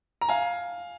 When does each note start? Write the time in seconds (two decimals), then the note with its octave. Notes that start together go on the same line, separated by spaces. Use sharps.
0.21 A#5
0.29 F5 G#5